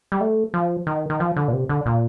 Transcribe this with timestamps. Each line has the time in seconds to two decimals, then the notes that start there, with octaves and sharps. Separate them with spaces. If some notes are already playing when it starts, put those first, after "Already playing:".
0.12 G3
0.21 A3
0.54 F3
0.87 D#3
1.10 D#3
1.20 F3
1.36 D3
1.48 A#2
1.53 C3
1.69 D3
1.86 A#2